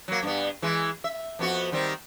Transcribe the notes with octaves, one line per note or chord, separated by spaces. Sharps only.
F#3 A#3
G2 B3
E3 G#3
E5
F2 B3 F#4
D#3 G3 C4